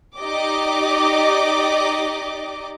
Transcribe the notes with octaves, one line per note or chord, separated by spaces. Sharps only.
D#4 G4 D5 D#5 D6